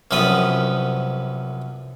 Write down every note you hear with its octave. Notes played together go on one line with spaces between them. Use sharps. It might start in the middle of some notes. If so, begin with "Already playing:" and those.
C2 F#2 F3 B3 B5 D#6